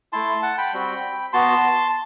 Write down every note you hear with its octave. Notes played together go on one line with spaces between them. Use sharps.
A3 E4 A5 C6
F#5 A5
G5 B5
G3 C4 F#4
B3 F#4 A5 C6